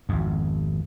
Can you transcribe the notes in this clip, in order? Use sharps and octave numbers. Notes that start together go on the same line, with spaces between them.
G#1 F2